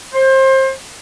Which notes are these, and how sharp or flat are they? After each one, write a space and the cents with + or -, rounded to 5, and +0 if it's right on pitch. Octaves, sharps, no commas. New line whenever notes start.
C5 +25